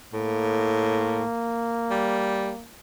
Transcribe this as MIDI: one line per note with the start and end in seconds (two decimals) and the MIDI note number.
0.13 1.24 45
0.13 2.65 58
1.90 2.51 55